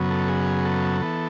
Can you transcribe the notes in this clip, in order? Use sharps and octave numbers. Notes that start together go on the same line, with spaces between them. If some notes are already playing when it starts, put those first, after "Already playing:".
Already playing: F#2 C#3 F#3 B3
A4
G#4
A4
E3 B3